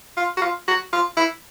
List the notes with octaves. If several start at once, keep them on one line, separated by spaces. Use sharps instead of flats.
F4
F#4
F4
F#4
F4
E4